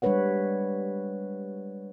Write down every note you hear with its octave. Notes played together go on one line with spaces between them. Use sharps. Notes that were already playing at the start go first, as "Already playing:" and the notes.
G3 G#3 D4 B4 C#5 F#5